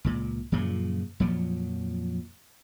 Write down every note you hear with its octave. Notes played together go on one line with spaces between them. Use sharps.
C#2 A#2
F#2 A#2 C#3 F3
F2 A#2 F3 F#3